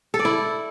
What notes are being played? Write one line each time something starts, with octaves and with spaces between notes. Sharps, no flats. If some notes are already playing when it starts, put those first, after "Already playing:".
A4
D5
E4